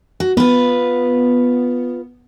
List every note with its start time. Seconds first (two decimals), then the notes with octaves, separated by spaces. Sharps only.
0.20 F#4
0.37 B3 F4 B4